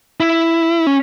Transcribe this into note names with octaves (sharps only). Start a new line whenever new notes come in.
E4
C#4